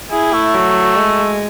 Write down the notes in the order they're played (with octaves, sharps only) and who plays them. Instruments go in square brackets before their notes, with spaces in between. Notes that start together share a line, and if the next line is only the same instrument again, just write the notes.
[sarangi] E4 [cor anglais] G#4
[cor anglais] A3
[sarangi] F#3
G#3